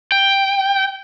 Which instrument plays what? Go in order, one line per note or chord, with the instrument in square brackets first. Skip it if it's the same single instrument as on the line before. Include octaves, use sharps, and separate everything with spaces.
[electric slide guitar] G5